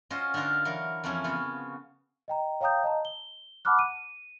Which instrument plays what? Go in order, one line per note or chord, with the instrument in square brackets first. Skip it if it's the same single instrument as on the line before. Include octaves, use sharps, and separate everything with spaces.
[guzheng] C#4 F4 F#4 C5 D#5
D3 D4 D#4 F4 A#4
E3 F#3 A#4
F2 E3 A#3 C#4 E4
C#3 B3 F4 F#4
[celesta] D#5 G5 A#5
C#5 F5 G5 A#5 D#6 G6
D#5 A5 A#5
G7
F#5 A5 B5 D6 F6 F#6
D#7